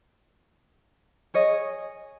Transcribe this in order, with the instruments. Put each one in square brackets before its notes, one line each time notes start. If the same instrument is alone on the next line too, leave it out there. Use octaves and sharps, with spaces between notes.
[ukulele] G#4 C#5 D#5